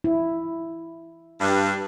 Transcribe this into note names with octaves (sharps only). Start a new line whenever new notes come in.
E4
G2